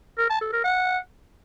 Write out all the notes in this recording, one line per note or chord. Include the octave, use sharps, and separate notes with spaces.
A#4
A5
A4
A#4
F#5